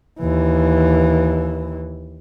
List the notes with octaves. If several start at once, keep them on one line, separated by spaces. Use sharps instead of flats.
D#2 E3